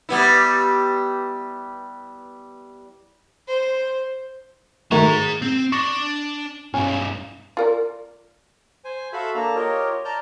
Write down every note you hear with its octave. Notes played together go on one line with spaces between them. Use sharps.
G3 B3 E4
C5
D#3 A3 F#4 G#4 A#5
C4
D4 C#6 A#6
B1 G2 C#4
F4 A#4 D5
C5 G#5
F#4 A4 E5 F5 B5 E6
A#3 D4 A4 A#5
F4 G4 A#4 C#5 D#5
D5 A5 A#5 F6 G6